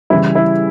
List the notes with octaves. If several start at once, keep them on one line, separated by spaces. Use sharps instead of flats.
C#3 E3 G3 E4
E4